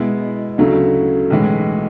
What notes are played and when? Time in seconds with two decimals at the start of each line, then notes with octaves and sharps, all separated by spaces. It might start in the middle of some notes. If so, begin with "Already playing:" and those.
Already playing: B2 G#3 B3 E4
0.58 D2 C#3 F#3 A3 E4
1.30 B1 A2 E3 G#3